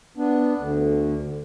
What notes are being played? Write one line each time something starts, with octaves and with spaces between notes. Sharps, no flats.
B3 D4
D2 D3